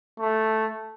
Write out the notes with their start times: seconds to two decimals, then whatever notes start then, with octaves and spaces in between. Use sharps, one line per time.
0.20 A3